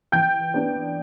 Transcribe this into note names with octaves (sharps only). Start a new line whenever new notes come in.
E3 G5 G6
B3 D4